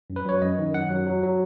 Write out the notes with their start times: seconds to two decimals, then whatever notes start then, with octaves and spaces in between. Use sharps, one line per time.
0.10 F#2
0.16 B4
0.25 F#3 C#5
0.42 F#2 D#5
0.59 D#3
0.74 F#2 F#5
0.90 F#3
1.06 F#3
1.23 F#3